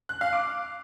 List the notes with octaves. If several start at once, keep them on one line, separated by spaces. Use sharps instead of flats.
F#6
F5
D6